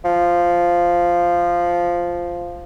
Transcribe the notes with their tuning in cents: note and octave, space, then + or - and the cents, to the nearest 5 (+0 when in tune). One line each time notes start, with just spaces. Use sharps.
F3 -5